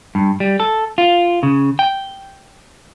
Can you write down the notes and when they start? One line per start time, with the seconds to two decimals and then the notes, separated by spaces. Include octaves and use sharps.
0.15 G2
0.40 G3
0.60 A4
0.98 F4
1.43 C#3
1.79 G5